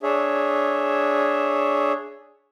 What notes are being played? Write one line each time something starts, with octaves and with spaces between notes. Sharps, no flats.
D4 G#4 C#5 E5